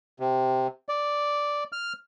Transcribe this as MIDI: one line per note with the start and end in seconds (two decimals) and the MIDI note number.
0.20 0.67 48
0.89 1.64 74
1.72 1.93 89